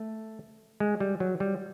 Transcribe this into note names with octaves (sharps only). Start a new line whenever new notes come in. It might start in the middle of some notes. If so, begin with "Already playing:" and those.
Already playing: A3
G#3
G3
F#3
G3